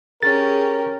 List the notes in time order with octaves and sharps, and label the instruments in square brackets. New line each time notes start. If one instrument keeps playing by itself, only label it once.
[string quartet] C#4 G4 [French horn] G#4 [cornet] A#4 [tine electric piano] A6